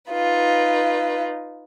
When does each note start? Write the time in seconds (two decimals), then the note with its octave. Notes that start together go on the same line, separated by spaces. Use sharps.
0.11 D#4 F4 B4